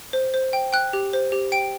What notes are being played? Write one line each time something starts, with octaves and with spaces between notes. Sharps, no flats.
C5
C5
G5
G5 F#6
G4
C5
G4
G5 D7